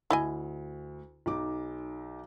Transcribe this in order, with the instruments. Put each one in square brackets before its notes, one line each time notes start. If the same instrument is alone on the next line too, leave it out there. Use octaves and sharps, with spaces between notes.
[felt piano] D2 [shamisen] E4 D#5 G#5
[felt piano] B1 D#4 D6